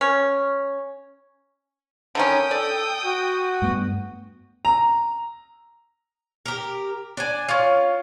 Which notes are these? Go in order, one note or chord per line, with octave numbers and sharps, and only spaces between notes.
C#4
D3 D#3 C#4 G5 D#6
A4 D5
F#4
G2 A3 B3
A#5
G4 A#4
D4 D5 G#5
C#4 F4